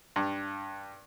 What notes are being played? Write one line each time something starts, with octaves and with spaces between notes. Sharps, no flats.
G2